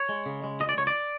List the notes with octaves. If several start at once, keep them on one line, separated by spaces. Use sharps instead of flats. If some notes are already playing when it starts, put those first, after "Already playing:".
Already playing: C#5
G#3
C#3
G#3
C#2 D#5
D5
C#2 C#5
D5